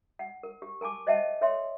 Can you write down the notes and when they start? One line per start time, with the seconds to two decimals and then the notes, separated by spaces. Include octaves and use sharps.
0.19 F#5
0.43 A#4
0.62 G4
0.81 A#4 G#5 A5 D6
1.07 C5 D#5 E5 F#5 G5 A5
1.41 A4 C#5 E5 G5 C6